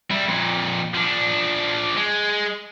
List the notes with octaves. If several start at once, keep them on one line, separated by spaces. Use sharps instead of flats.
G3 E4
F2 A#2
F3 D4
G#3